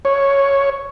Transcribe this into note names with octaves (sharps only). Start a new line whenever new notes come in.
C#5